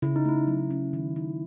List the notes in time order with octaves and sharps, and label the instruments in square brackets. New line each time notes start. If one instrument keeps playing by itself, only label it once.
[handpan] C#3 [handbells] E4
[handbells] D#4
[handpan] A3 [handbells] E4
[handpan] F#3
C#4
D#3
D#4